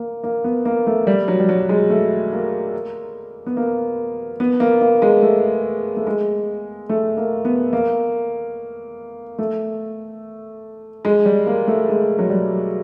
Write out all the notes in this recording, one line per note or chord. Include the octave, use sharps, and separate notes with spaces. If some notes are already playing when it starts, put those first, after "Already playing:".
Already playing: A#3
A#3
B3
A#3
A3
G3
F#3
G3
F#3
G#3
A3
A#3
B3
A#3
B3
A#3
A#3
G#3
A3
A3
G#3
A3
A#3
B3
A#3
A3
G#3
G3
A#3
A3
G#3
F#3
G3